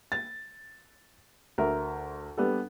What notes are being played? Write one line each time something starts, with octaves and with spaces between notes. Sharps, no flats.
A6
D2 A#4 E5
G3 B3 D4 A4